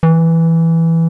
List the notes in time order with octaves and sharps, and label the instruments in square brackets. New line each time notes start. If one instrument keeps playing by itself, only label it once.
[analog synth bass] E3